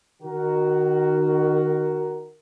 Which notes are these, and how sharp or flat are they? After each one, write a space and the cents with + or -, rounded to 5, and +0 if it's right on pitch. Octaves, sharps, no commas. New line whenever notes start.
D#3 -30 F#4 +10 A#4 +0